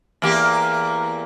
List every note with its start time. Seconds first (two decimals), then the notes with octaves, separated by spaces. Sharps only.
0.22 E2 A#3 G4